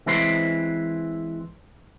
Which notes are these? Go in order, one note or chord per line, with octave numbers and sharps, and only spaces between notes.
E3 G#3 C4 E4 B4 C5